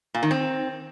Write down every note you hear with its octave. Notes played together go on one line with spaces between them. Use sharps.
A#2
D#3
C4